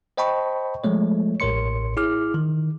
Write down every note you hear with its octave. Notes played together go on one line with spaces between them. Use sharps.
C5 D#5 G5 A5 B5 C#6
F3 G#3 A3 C#5
A1 A2 A#4 C#5 C6 C#7
E4 G#4 D6 F6
D#3